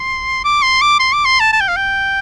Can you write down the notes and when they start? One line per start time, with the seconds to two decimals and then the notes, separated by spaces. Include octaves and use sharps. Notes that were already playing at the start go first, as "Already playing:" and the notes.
Already playing: C6
0.44 D6
0.62 C6
0.81 D6
0.99 C6
1.13 D6
1.25 C6
1.40 A5
1.53 A5
1.61 G5
1.68 F5
1.76 G5